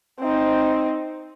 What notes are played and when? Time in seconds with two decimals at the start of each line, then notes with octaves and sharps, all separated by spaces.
0.19 C4 D#4